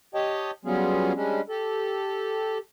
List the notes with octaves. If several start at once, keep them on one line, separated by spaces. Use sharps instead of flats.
G4 C#5 D#5 G5 A5
F#3 G3 B3 C#4 F4 G#4
G3 G#3 C#4 D4
G4 A4